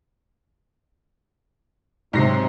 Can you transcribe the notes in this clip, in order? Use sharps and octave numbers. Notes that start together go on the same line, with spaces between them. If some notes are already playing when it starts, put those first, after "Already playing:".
G#2 C3 F#3 A#6 C7